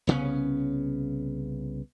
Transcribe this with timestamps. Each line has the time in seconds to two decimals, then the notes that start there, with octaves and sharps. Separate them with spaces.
0.07 C2 C#3 B3 C#4